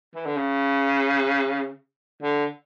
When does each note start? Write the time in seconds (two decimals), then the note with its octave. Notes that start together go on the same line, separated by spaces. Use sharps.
0.15 E3
0.26 D3
0.36 C#3
2.23 D3